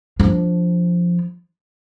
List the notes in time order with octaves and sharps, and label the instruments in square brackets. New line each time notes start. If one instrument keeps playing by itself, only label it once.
[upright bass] F3 D4